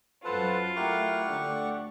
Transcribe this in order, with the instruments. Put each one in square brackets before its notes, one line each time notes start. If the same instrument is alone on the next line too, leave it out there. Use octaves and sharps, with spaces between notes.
[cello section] F#2 F#3 [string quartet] F4 [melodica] A4 F#5 [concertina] B4 C5 A5
[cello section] A3 [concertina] E4 A#4 [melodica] G4 F#5 C#6
[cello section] D2 D5 [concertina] A4